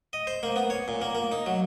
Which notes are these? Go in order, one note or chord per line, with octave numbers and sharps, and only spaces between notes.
D#5
C5
A#3
B3
C#5
A#2
A#3
A#3
D#4
F#3